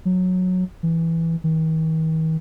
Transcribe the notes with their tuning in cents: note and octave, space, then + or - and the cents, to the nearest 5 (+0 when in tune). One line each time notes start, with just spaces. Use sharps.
F#3 -15
E3 +0
D#3 +45